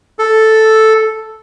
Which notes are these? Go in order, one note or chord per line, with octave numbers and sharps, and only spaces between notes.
A4